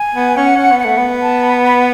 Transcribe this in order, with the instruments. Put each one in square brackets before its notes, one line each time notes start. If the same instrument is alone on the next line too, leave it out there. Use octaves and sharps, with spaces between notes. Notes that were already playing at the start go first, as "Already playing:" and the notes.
Already playing: [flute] G#5
[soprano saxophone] B3
[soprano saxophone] C#4 [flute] F#5
[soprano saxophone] C#4
B3
[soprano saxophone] A3 [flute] F#5
[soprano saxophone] B3
[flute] A5
B5
B5